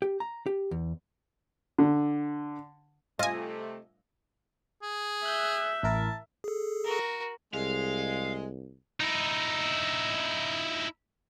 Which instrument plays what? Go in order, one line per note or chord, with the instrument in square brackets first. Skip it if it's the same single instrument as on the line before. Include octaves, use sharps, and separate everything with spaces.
[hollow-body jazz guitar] G4
A#5
G4
E2
[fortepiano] D3
[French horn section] C3 A3 [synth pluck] F4 G#5 [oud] D#5
[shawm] G#4
[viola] E5 [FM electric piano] F#6 G6
[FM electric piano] A1 E4 A#4 [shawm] A5
[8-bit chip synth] G#4 A4
[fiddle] F#4 A#4
[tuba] C2 [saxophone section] G#3 [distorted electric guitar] F5
[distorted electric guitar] D#4 E4